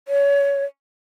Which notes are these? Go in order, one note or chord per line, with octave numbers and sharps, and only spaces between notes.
C#5